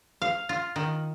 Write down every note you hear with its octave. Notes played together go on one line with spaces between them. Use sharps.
F5
F4
D#3